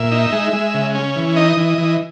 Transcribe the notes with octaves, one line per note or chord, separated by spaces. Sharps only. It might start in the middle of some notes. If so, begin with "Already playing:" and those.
Already playing: A#2 E5
D#4
G#3
G#3
C#3
C#4
E3
D#4 D#5
E3
E3